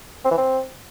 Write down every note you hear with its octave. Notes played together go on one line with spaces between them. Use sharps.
C4
E3
C4